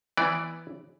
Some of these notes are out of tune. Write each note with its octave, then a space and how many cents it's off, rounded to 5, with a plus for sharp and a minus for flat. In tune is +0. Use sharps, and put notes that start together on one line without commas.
E3 +0 B3 +0 D5 +0